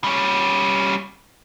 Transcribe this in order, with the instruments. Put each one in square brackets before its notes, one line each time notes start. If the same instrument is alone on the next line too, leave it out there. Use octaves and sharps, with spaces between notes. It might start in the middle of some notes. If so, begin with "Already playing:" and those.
[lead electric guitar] G3 C#4